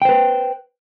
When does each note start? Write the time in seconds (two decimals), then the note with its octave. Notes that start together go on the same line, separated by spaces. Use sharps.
0.02 G5
0.05 C5
0.09 B4